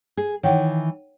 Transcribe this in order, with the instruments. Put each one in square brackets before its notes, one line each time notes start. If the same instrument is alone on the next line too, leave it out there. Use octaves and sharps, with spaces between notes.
[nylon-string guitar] G#4
[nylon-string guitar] D#3 E3 [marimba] C#5 F#5 G5